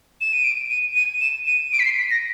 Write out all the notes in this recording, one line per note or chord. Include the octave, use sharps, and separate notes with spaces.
E7
D#7
D7
D#7
D#7
E7
D#7
D7
B6
C7
B6
A#6